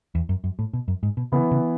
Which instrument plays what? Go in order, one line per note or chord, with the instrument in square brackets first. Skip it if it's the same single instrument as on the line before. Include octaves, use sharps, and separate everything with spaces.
[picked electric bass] E2
F#2
F#2
A2
B2
F#2
G#2
B2
[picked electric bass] C#3 [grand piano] E3 B3 E4
[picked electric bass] C#3